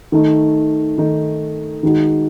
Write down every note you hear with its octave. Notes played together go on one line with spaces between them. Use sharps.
D#3 A3 D#4
D#3 A3 D#4
D#3 G#3 D#4 F#4